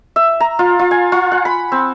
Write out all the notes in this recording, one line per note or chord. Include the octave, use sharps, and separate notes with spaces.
E5
A#5
F4
F4
G#5
F4
F#5
B5
C4